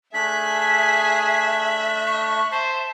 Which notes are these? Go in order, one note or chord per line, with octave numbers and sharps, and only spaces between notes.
A3 D4 G#4 E5 F#6 B6
C#6
C5 A5